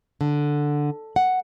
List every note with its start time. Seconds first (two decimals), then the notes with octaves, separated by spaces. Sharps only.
0.21 D3
1.16 F#5